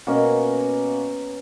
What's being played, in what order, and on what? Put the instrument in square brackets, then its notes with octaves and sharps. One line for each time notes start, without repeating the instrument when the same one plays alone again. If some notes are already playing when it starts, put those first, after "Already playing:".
[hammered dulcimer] B2 A#3 C#4 F#4